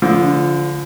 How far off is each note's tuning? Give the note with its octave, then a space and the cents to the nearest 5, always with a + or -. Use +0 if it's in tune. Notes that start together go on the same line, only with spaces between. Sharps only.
D3 -30 F3 -10